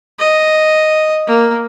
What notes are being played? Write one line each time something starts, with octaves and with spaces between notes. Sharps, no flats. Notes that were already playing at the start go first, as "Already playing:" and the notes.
D#5
A#3